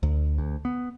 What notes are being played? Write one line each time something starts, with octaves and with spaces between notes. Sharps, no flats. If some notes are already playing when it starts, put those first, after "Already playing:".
D2
D2
B3